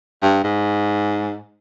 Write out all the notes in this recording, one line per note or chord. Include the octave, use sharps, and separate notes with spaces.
G2
G#2